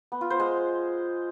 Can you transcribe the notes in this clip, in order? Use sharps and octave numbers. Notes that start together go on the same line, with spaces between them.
B3
F4
C5
G#3